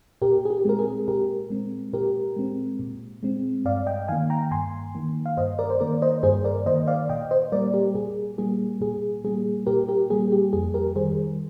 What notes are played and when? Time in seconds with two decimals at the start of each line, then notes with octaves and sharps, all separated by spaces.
0.22 A#2 G4 A#4
0.45 G#4
0.50 G4
0.65 G#3 C4 A#4
0.79 G#4
1.08 A#2 G4 A#4
1.50 G#3 C4
1.93 A#2 G4 A#4
2.36 G#3 C4
2.79 A#2
3.23 G#3 C4
3.65 G2 D5 F5
3.86 D#5 G5
4.08 D#3 A#3 F5 G#5
4.30 G5 A#5
4.51 G2 G#5 C6
4.95 D#3 A#3
5.26 F5
5.37 G2 C5 D#5
5.59 A#4 D5
5.70 C5
5.80 D#3 A#3 A#4 D5
6.02 C5 D#5
6.23 G2 G#4 C5
6.44 A#4 D5
6.66 D#3 A#3 C5 D#5
6.87 D5 F5
7.09 A#2 D#5 G5
7.31 C5 D#5
7.52 G3 A#3 A#4 D5
7.73 G4 A#4
7.95 A#2 G#4
8.38 G3 A#3 G#4
8.81 A#2 G#4
9.24 G3 A#3 G#4
9.67 A#2 G4 A#4
9.88 G4 A#4
10.10 G3 A#3 G#4
10.32 G4
10.53 F2 G#4
10.74 G4 A#4
10.96 D#3 G3 G#4 C5